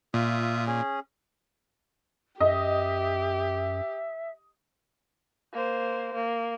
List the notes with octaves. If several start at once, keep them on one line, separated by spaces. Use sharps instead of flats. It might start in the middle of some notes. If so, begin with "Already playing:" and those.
A#2 F4 E5 D#6
C#4 G#4
F#2 G4 D#5 E5
A#3 C5
A#3